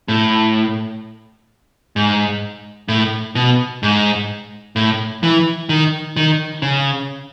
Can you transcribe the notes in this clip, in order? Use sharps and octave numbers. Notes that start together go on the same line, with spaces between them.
A2
G#2
A2
B2
G#2
A2
E3
D#3
D#3
C#3